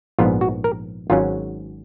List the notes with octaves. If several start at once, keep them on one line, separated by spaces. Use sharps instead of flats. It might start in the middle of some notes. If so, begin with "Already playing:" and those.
A#1 G#2 F3 B3 F4
F#4
A#4
G#1 G#2 F#3 C#4 F4